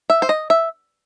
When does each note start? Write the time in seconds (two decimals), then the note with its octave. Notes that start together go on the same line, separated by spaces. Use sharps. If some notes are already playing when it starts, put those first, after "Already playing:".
0.10 E5
0.22 C5
0.29 D#5
0.50 E5